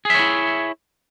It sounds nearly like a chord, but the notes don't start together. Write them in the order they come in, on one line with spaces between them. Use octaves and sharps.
G#4 E5 C#5 E4